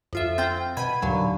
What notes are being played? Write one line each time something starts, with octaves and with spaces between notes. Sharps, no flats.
F2 F4 E5
C4 F4 G5
B2 B5 G#6 D#7
D#2 A#2 D3 F#3